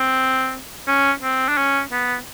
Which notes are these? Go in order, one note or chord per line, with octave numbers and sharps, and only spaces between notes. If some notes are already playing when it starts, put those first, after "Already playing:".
Already playing: C4
C#4
C4
D4
C#4
B3